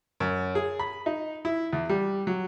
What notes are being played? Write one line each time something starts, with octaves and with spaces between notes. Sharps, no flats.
F#2
G#4
B5
D#4
E4
E2
G3
F#3